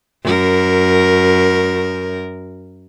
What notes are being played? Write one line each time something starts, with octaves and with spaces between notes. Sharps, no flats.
F#2 A#4